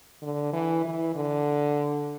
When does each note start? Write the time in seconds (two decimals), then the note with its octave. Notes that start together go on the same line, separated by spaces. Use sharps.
0.22 D3
0.53 E3
0.85 E3
1.16 D3